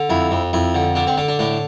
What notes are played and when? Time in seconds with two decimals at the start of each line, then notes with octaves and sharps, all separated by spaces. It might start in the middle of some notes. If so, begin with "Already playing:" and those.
Already playing: D3
0.10 F2 E4
0.31 F2
0.53 F2 E4
0.75 D3
0.95 D3 D4
1.07 C4
1.17 D3 D4
1.28 D4
1.39 A2 D4